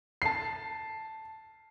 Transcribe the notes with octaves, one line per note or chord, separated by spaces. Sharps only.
A5 C7